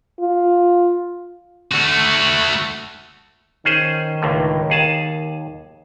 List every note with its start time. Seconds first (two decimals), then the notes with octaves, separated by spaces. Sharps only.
0.20 F4
1.71 A3 F#4
3.65 D#3 C#4 G#4 C5
4.22 C#2 A2 D3
4.70 D#2 G#4 A5